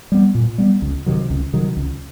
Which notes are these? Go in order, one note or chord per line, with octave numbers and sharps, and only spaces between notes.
G3 B3
A#2
G3 B3
C#2
C3 D#3 F#3
C#2
C3 D#3 F#3
C#2